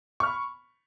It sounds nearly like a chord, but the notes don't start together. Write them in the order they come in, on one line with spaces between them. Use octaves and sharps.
C#6 F6 B5